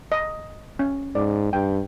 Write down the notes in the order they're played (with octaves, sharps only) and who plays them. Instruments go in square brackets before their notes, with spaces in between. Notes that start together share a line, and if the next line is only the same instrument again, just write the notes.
[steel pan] D#5
C#4
[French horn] G#2 [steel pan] D5
[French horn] G2 [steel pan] G5